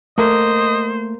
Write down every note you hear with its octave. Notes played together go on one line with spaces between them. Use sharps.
A3 A#3 C5 D#5